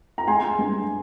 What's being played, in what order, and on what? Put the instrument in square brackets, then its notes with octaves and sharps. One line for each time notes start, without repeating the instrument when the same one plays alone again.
[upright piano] A#5
G#3 G#5 C6
G2